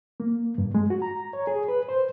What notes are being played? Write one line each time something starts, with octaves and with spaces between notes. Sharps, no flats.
A#3
G2
G#3
F#4
A#5
C#5
G#4
B4
C5